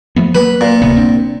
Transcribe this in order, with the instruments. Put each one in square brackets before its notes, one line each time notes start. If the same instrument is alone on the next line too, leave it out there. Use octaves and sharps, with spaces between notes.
[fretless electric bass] F3 A3 B3
[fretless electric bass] F#3 A#3 [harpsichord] B4
[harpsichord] A#2
[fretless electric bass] D1 C3 B3
C4 D4